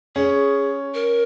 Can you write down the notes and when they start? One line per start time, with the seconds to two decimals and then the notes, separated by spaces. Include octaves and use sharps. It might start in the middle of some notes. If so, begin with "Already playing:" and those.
0.15 C#4 G#4
0.94 A#4